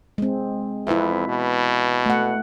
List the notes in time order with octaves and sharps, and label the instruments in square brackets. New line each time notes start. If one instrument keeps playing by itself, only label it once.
[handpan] G#3 C4
[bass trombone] F2 [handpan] E4 B4 E5
[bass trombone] B2
[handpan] A3 F#5